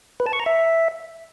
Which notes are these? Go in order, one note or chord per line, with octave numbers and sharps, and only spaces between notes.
B4
A5
C#6
A#5
E5